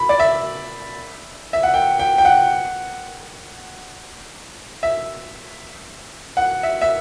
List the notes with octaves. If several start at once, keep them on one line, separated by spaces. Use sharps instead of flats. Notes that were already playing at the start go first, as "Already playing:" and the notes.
Already playing: B5
D5
E5
E5
F#5
G5
G5
G5
F#5
E5
F#5
E5
E5